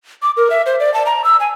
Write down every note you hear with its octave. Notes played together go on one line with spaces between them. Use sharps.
D6
A#4
E5
C5
D5
A5
A#5
E6
G#5